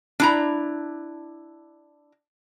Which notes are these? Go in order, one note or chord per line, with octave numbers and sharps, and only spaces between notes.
D4 E4 A#5